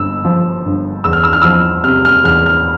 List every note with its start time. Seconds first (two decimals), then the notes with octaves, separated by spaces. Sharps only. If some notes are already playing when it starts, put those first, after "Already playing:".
Already playing: G1 E6
0.25 F3
0.65 G1
1.04 E2 E6
1.13 F6
1.24 E6
1.33 F6
1.42 F3 E6
1.84 C3 F6
2.05 F6
2.23 E2 F6
2.46 F6